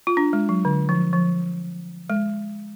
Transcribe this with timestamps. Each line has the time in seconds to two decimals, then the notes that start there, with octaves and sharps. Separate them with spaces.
0.07 F4
0.17 D4
0.33 G#3
0.49 F#3
0.65 D3
0.89 F3
1.13 F3
2.10 G#3